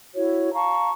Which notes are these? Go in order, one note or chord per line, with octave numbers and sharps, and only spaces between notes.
E4 F#4 C#5
F5 A5 A#5 C#6